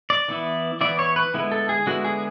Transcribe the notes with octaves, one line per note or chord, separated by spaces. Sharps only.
D5
E3 B3 E4
E3 B3 E4 D5
C#5
B4
D3 G#3 B3 E4
A4
G#4
D3 G#3 B3 E4 F#4
G#4